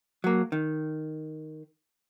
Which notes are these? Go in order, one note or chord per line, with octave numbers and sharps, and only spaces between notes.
F#3 A#3
D#3